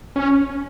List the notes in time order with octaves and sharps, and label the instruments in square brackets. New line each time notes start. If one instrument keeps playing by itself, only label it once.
[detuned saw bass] C#4